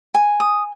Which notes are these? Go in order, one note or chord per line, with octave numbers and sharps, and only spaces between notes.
G#5
D#6